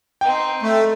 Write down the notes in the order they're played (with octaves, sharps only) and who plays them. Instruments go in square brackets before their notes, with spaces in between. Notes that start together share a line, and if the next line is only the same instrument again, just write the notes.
[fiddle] C4 D#4 [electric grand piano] G5
[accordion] A3